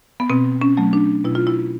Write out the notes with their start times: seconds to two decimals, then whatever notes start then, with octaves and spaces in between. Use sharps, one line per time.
0.20 B3
0.30 B2 C4
0.61 C#4
0.77 F#3 A3
0.93 D4
1.25 B2 E4
1.35 F4
1.47 E4